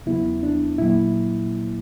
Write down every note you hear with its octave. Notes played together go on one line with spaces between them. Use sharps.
E2 C#3 F#3 B3 E4
D4
A#2 F#3 A#3 E4